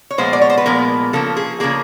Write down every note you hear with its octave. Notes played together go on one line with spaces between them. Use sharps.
C#5
A#2 F3 G#3 B3 C5
D5
C#5
C5
B4
A#2 F3 G#3 B3 A#4
C#3 F3 A#3 A4
G#4
C#3 F3 A#3 G#4